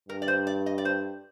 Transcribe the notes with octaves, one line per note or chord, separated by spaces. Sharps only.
G2 A#4
D5
C5
D5
D#5
D5
C5